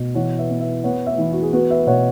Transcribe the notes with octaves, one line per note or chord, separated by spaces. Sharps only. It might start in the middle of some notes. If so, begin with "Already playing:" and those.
Already playing: B2
E3 C#5 F#5
B4 E5
B3
B4 E5
B3 C#5 F#5
B4 E5
E3 E4
F#4
G#4
B3 F#4 B4
B4 E5
B2 C#5 F#5